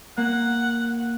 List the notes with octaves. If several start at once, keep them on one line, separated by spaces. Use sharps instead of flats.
A#3 F#5